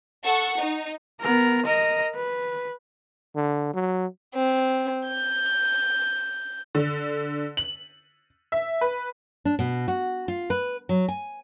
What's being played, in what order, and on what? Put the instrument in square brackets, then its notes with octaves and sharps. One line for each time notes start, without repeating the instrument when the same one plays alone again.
[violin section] A4 F#5 C#6
D#4
[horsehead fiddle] B3 A#4
A#4 D#5
B4
[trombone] D3
F#3
[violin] C4
G6
[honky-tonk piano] D3
F#7
E5
B4
[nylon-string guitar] D4
B2
F#4
F4
B4
F#3
G#5